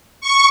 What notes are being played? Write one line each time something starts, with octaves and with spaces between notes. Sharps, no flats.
C#6